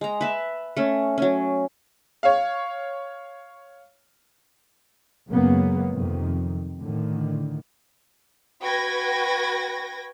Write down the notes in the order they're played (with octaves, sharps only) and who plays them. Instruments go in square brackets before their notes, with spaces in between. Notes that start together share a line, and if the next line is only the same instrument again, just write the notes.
[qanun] G#3 A#5
B4 E5 A5
A3 C#4
F#3 C#4
[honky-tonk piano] C#5 F5
[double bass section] F#2 C#3 F#3 G#3 A#3 B3
F2 C3 D#3
A2 D3 D#3
[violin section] F#4 B4 G5 G#6 A#6